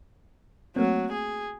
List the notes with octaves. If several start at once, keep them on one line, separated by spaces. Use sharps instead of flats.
F#3 A3 A#3 C4
G#4